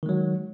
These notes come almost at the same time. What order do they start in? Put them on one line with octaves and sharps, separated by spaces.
D#3 G#3 F#3